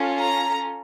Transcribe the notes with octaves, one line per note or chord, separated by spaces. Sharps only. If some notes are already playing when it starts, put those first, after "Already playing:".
Already playing: C#4 F4 A4
A#5